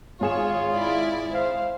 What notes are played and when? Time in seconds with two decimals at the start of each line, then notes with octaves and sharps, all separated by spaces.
0.21 G#1 F4 G#4 C#5 E7
0.74 E4 D5
1.34 C5 F5